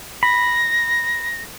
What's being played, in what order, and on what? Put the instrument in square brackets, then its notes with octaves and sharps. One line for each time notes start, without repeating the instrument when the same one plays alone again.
[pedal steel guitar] B5 [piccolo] A#6